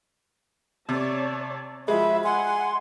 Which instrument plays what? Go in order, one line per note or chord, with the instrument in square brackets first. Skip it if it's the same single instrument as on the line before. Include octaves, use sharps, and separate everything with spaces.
[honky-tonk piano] C3 [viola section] C#5 D5 A5
[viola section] F3 F#4 [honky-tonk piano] G#3 [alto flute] E5 [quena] B5
[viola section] F#5 [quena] G#5 [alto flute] C6